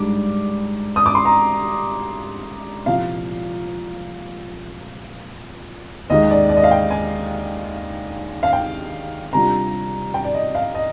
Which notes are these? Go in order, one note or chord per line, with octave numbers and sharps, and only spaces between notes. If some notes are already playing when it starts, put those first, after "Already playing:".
Already playing: G#2 G3 D4 D6
D#6
D6
C6
A#5
C2 A#2 F3 F5
D#2 D#3 G#3 D#5
D5
D5
D#5
F5
G5
G#5
F5
G5
C3 G3 D4 F4 A#5
G5
D5
D#5
F5
D#5